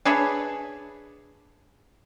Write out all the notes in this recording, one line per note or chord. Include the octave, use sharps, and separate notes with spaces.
D4 G#4 B4 C#5 E5